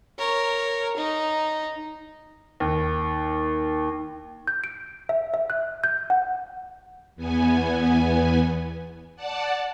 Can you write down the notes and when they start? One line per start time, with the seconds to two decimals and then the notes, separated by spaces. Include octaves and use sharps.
0.19 A#4 C#5
0.97 D#4
2.60 D#2
4.48 G6
4.64 D7
5.09 E5
5.34 E5
5.50 F#6
5.84 G6
6.10 F#5
7.16 E2 B3 G#5
9.16 D5 F#5 A5